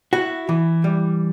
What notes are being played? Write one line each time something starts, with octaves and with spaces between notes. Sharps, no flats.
E4 F#4
E3
G3